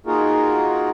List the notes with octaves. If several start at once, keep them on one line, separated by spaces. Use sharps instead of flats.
A#3 D#4 F4 F#4 G#4 A#4